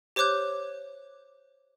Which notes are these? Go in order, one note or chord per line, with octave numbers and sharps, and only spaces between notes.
G4 C5 C#5 D6 F#6 G6